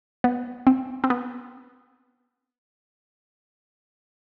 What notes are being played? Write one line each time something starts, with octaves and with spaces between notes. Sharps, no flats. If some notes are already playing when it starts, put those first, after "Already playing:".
B3
C4
C4
B3